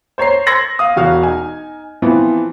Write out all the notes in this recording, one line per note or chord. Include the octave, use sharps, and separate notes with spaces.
C5 C#5 A#5 C7
C6 E6 G#6 A#6 C#7 F#7
F5 D#6
E1 F#4 F5 F6
D#4 G#5
E3 F3 B3 C4